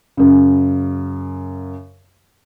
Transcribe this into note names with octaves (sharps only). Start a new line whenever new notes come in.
F#2 C#3